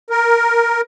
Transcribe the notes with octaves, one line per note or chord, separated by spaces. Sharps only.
A#4